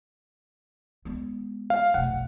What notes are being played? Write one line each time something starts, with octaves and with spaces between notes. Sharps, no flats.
G#3 B3
F5
F1 B1 F#5